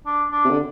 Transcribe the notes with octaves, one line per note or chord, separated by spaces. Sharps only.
D4
D4
C3
D3